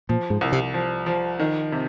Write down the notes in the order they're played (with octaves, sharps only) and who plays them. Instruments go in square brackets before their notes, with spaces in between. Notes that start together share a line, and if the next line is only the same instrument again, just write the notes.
[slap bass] A#2 [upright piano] F3
[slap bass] G#2
[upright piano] C2
[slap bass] C3
[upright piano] F3
F3
D#3
C3